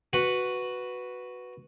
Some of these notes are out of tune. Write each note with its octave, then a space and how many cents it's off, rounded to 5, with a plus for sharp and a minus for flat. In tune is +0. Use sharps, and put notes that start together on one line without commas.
F#4 +0 B4 +0